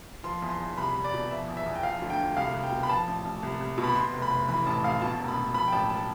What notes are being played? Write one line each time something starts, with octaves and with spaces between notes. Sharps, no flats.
F3 C6
E2
C6
E2
C2 B5
C2
D5
B2
F3 E5
E2
E5
E2
G5
F3 F5
D2
G5
D2
C2 F5
C2
G5
B2
B5
F3 A5
A1
A1
C2
C2
B2
B5
B2 C6
F1
B5
F1
E3 B5
A1 A5
A1 F5
B2 A5
E1
B5
E1
F3 B5
G5
A1 A5
A5